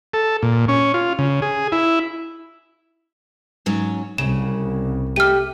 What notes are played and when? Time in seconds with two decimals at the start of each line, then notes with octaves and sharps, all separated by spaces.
0.14 A4
0.43 A#2
0.68 C#4
0.94 F4
1.19 C#3
1.42 G#4
1.72 E4
3.66 G#2 F#3 C#4
4.18 C2 C#3 E7
5.16 A3 G4 F6 D#7